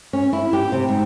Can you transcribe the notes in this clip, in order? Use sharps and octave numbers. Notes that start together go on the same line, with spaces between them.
C#4
E4
G4
C3
G#2